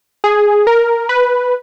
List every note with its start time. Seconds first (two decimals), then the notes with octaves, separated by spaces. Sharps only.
0.24 G#4
0.67 A#4
1.09 B4